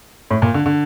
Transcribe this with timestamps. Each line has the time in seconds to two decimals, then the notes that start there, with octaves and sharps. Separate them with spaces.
0.31 A2
0.42 A#2
0.54 D3
0.66 D3